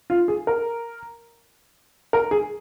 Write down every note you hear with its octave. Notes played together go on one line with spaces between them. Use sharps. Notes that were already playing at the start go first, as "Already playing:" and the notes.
F4
G#4
A#4
A#4
G#4